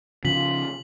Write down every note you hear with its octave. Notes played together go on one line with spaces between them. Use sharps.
C#3 F3 F4 B6 F#7